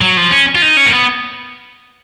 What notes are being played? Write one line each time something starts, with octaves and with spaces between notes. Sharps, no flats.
F#3
F3
C#4
F4
D#4
C#4
A#3
B3